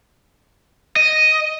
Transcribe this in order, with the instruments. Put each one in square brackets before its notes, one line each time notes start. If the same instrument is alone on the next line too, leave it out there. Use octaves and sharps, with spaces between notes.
[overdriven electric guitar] D#5